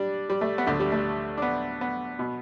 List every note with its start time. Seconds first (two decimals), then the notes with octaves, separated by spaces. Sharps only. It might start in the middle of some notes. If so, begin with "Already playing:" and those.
Already playing: G3 D4
0.30 G3
0.41 A3
0.58 B3
0.67 D2 D3 A3
0.80 G3
0.92 A3
1.37 D4
1.42 B3
1.81 B3
2.19 B2